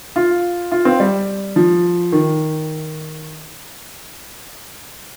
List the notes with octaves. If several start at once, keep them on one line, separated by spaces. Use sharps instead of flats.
F4
F4
C4
G3
F3
D#3